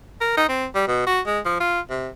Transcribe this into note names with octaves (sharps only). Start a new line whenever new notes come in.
A#4
D#4
C4
G3
B2
F#4
G#3
F3
F4
C3